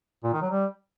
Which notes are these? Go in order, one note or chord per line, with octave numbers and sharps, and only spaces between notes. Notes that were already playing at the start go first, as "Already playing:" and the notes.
A#2
D#3
F#3
G3